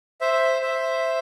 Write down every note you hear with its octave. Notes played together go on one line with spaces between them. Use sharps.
C5 E5
C5 E5